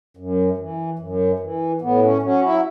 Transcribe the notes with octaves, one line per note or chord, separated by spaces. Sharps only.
F#2
E3
F#2
E3
A2 B3
C#4
F#3 C#4
E4